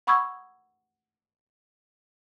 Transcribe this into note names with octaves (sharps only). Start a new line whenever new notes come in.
F#5 B5 C#6 D#6 E6 G#6